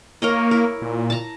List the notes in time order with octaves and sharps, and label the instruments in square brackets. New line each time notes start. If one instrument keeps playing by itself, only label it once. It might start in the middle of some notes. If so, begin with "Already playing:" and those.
[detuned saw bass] A#3 [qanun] A#4 C#5 D#5
[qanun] E4 A#4
[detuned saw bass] A#2
[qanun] A5 A#5